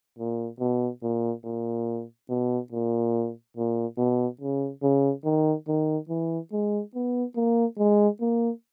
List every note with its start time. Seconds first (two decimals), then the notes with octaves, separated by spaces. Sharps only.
0.19 A#2
0.60 B2
1.03 A#2
1.44 A#2
2.29 B2
2.72 A#2
3.57 A#2
3.98 B2
4.41 C#3
4.83 C#3
5.25 D#3
5.68 D#3
6.09 E3
6.52 G#3
6.95 B3
7.36 A#3
7.78 G#3
8.21 A#3